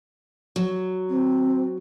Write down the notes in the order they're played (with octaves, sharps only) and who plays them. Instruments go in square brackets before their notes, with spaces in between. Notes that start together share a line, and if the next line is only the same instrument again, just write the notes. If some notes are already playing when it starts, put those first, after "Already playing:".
[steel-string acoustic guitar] F#3
[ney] C4